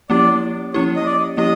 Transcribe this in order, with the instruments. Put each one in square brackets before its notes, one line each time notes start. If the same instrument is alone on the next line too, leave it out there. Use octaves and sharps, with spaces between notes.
[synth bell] F3 A#3 C#4 E4 G4 [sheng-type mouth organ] D5
[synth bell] F3 A#3 C#4 E4 G4 [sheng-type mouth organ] C#5
[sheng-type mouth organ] D#5
D5
[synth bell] F3 A#3 C#4 E4 G4 [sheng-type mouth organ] D#5